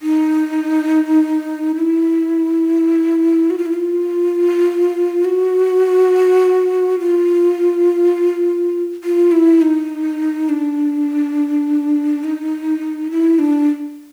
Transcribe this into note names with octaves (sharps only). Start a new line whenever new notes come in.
D#4
E4
F#4
F4
E4
F4
F#4
F4
F4
E4
D#4
D4
D#4
E4
D4